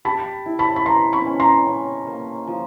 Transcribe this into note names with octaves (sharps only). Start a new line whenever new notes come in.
G4 A5 B5
E4
A5 B5
B5
B4 A#5 C6
B5 C#6
C#4
A#5 C6
C#4
A#3
F3